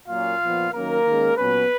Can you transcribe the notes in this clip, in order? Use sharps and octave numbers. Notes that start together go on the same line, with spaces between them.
A#2 F#3 A#3 C#4 F4 F5
A#2 F3 B3
D#3 F#3 A#3 C#4 A#4
D#3 G#3 C#4
A#2 F#3 B3 C#4 B4